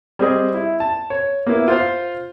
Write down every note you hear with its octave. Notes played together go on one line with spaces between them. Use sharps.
G3 C4 G#4 D#5
E4
A5
C#5
A#3 B3 E4
F4 C5 F5